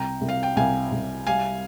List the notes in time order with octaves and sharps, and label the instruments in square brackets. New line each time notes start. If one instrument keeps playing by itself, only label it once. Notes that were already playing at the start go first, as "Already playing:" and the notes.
Already playing: [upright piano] C2 [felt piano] G5 A#5
[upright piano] C2
[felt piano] F5
G5
[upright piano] C2 [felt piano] F5 G#5
[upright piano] C2
[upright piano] G3 [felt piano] F5 G#5